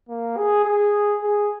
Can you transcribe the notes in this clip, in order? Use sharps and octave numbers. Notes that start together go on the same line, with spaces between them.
A#3
G#4
G#4
G#4